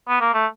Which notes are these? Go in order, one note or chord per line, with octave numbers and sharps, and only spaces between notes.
B3
A#3
A3